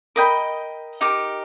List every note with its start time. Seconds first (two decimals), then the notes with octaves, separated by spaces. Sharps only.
0.16 A#4 D#5 G5 B5
1.01 D#4 G4 A#4